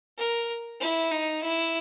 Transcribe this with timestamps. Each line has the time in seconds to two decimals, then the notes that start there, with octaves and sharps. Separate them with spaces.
0.18 A#4
0.81 E4
1.11 D#4
1.43 E4